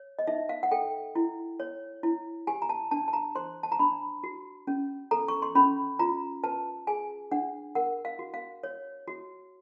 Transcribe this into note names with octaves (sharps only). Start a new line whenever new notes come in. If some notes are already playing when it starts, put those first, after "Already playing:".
Already playing: C#5
D#5
D#4 E5
F5
F#5
A4 G5
E4
C#5
E4
G4 G#5
A#5
A5
D4 A5
A5
A#5
C5 C6
A5
A#5
D4 B5
F#4
C#4
A4 A#5
C#6
C6
C#4 B5
F4 A#5
B4 A5
G#4 G#5
D4 F#5
A#4 F#5
F5
F#4
F5
C#5
F#4